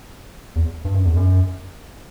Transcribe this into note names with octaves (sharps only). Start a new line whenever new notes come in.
E2
G2
F#2
E2
F#2